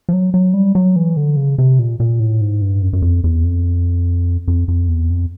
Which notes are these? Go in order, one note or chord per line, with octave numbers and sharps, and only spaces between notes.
F3
F#3
F#3
G3
F#3
E3
D3
C#3
C3
A#2
A#2
A2
G#2
G2
F#2
F#2
F2
E2
F2
F2
F2
E2
F2